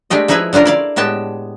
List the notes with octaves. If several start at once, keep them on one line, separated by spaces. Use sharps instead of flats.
G#3 A3 D4 G4 D#5
F3 D#4 E4 G#4 B4 E5
D3 C#4 D4 F4 A#4
E4 D5 F5
A2 G#3 B3 G4 A5